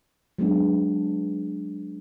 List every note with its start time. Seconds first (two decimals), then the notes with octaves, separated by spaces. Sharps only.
0.39 F#3 G#3 B3 D4